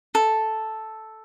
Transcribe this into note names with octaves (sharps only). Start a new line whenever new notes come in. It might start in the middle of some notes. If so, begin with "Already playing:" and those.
A4